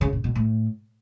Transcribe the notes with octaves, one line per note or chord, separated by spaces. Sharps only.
C#3
A#2
B2
A2